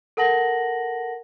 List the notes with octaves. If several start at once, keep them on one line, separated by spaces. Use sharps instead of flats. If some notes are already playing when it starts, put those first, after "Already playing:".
A4 A#4 F#5 A5 A#6 F#7